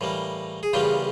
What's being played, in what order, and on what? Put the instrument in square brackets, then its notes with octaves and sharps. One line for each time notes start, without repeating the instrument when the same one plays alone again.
[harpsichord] A2 E3 G3 A#3
G#4
E2 C#3 E3 G3 A#3 F4 G4